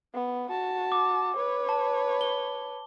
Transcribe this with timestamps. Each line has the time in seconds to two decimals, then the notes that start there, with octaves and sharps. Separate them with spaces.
0.14 B3
0.51 F#4 A5
0.92 D6
1.36 B4 C#5
1.69 A5
2.21 G7